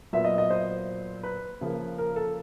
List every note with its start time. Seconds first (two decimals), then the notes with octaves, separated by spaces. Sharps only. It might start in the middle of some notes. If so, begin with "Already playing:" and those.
0.13 A#2 F#3 B3 E5
0.25 D#5
0.38 D#5
0.50 C5
1.23 B4
1.61 C#3 F3 A#3
1.98 A#4
2.16 A4